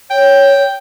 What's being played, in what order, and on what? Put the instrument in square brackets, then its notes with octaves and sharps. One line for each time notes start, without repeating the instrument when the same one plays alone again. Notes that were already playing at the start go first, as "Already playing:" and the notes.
[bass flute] C#5 [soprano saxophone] G5